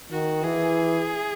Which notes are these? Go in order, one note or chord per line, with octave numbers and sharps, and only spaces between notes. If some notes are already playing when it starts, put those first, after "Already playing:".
D#3 F#4
E3 G#4